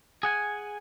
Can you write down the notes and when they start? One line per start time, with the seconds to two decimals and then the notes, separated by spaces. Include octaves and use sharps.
0.23 G#4 F#5 G#5